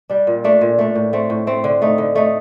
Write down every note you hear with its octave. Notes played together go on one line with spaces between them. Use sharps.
G3 D4
A#2
A3 D4
A#2
A3 D4
A2
A3 C4
A2
A3 C4
D3
A3 D#4
D3
A3 D#4